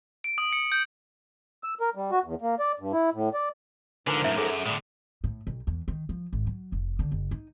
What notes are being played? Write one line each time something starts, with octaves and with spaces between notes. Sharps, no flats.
D7
D#6
C#7
G6
E6
A#4
G3
F#4
E2
A#3
D5
G2
E4
A2
D5
G#2 D3 F3 A#4 B4 G#5
F#2 A2 E5
F#2 G#4 A4
A2 D3 G3 D#6
A2
B1
E2
D#3
F3
G#1
F#3
F1
D3
F#1
D#4